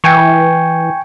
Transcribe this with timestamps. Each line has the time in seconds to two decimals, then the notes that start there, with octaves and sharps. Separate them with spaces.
0.04 E3 G5 G#5 C#6